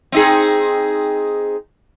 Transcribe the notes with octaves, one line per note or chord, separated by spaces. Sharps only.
C4 D#4 G#4